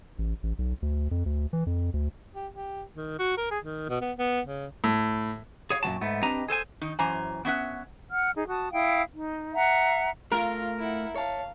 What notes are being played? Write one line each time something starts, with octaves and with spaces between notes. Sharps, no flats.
A1
A1
B1
D2
F2
D2
E3
F2
D2
G4
G4
D#3
F#4
A#4
G#4
D#3
B2
B3
B3
C#3
A2
G#4 C#5 F5
F#2 A#2 F#3 F#4 A5
G#2 A3 B3
C4 D4 G4 B4 D#5 A#5
G#4 A4 C5 G#5
D#3 D#4
F#2 E3 C5 G#5 A#5
B3 C#4 E5 F#5
F#5 F6
D#4 G#4
F#4 A5 D#6
E4 F5 G5 D#6
D#4
E5 F#5 A#5
A3 F4 A#4 F5
E4 F#5
C#5 F5 A5